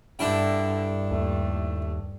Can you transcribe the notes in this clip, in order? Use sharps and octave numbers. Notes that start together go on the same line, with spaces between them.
G2 D3 D4 E4 G5
D#2 A3